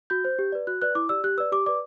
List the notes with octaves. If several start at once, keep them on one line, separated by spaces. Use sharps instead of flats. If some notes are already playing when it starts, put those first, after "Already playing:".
F#4 G6
C5
G4
B4 D5
F#4 F#6
B4 D5 F#6
E4 D6
G4 D5 E6
G4 F#6
B4 D5 E6
G4 D6
B4 D5 D6